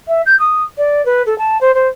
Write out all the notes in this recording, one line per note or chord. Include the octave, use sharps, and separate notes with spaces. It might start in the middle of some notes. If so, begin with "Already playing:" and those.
E5
G6
D#6
D5
B4
A4
A5
C5
C5